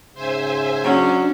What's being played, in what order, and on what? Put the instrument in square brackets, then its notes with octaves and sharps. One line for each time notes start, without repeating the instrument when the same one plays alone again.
[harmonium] G#2 C#3 [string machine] C5 E5 G#5
[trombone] F#3 [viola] C#4 [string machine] D4